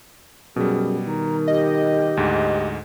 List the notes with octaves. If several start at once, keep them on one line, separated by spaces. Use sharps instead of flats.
F#2 B2 G3 G#4
D#3 A#5
G4 D#5
D2 G#2